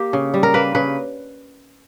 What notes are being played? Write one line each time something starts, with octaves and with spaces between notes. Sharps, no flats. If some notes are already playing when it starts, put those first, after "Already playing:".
Already playing: A#3 G4
C#3
G3
A#4
A#3 B4
C#3 B4